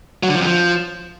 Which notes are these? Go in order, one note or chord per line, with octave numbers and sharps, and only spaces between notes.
F#3
D3
F3
F2
F3